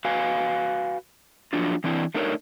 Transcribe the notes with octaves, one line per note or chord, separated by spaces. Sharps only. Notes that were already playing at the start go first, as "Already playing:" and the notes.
F#4 B4 F5 G#5
F3 F#3 D4 F4
E3 C4 D4 E4
A3 D4 D#4 A#4 C#5